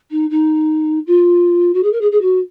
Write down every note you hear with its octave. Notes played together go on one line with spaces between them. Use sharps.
D#4
D#4
F4
F#4
G#4
A#4
G#4
G#4
F#4